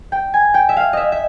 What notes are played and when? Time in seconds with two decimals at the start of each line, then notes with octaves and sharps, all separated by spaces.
0.12 G5
0.34 G#5
0.54 G5
0.69 E5
0.77 F5
0.93 D#5 E5
1.12 E5